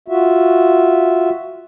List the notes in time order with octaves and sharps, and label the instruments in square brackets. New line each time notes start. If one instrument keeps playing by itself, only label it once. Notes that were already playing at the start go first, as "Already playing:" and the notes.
[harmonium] F4 F#4 E5